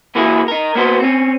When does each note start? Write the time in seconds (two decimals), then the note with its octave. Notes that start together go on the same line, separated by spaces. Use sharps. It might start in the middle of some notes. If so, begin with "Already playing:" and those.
0.15 A#2 E3 A#3 E4 F#4 G#4
0.48 D#4 A#4
0.75 A#3 B3 F#4 C5
1.00 C4 C#4